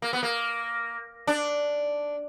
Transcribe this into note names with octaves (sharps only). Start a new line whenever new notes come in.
A#3
B3
A#3
D4